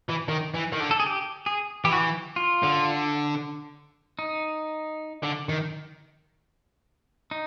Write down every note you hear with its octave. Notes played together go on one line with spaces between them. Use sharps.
E3
D#3
E3
D#3
D3
A4
G#4
G4
G#4
E3 G4
F#4
G4
F4
D3
D#4
D3
D#3
D#4